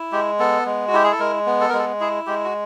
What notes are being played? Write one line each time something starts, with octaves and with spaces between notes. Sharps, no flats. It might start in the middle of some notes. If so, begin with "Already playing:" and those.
Already playing: E4
G#3 G4
B3 A4
G#3
F#4
E4 G4
G#4
A4
G#3 A#4
B3
A4
G#3 A#4
A4
E4 G#4
G#3 G4
F#4